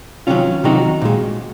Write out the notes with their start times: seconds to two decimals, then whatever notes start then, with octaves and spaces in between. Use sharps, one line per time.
0.27 C3 D#3 F#3 C#4 F4
0.64 C3 D#3 F#3 D#4 F#4
1.01 A#2 G#3